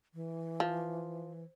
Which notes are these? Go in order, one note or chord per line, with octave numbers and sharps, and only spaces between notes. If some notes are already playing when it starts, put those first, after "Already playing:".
E3
F3